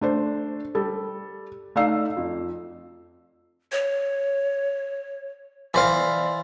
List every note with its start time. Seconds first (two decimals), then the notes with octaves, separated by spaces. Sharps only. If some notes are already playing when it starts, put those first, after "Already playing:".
0.01 A3 D4 C5
0.75 G3 A4
1.76 A3 D#4 D5 F5 E6 C7
2.17 F2
3.72 C#5
5.74 E3 C5 D5 F5